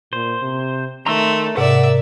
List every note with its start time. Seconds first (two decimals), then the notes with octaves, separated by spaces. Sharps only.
0.13 A#2 C5
0.42 C3
1.06 D#3 A3 A#5 C6 E6
1.57 G#2 C3 A#4 D5 E5 F#5